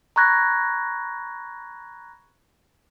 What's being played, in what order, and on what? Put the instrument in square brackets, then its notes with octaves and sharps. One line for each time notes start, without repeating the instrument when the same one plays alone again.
[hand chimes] A#5 B5 C#6 F#6 G#6 A#6